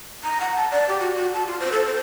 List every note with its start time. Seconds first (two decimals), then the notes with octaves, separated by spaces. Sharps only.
0.23 A#5
0.41 F#5
0.56 A5
0.71 D5
0.89 G4
1.00 F#4
1.16 F#4
1.33 A5
1.47 F4
1.60 C5
1.72 A4
1.86 C5